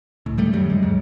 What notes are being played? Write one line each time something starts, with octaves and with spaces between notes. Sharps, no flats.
C#2 A2
D#3 G3 A3
F#2 D3 F#3 G3
F1 G3 G#3
G1 D#2 G#2 F#3